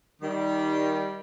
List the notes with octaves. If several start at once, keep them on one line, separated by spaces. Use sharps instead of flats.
D#3 G3